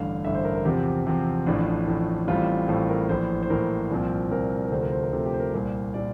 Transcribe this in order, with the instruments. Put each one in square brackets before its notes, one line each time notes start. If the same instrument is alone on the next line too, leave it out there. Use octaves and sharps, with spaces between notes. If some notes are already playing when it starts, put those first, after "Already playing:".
Already playing: [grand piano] A1 G2 D3 F5
A1 G2 D3 E5
C5
A#4
A#4
E2 C3 F3 C4 G4
E2 C3 F3 C4
A1 A2 F3 D4
D4
A1 A2 F3
A1 A2 G3 C4 F4
A1 A2 G3 C4 A4
A#4
A#1 A2 E3 C5
C5
A#1 A2 E3 A#4
C2 A#2 F3 C4
C2 A#2 F3 C4 A#4
A#4
D2 C3 F3 A3 C5
A#4
C5
A#4
D2 C3 F3 A3 A4
G4
C5
A#4
C2 A#2 G3 C5
A#2 G3 D5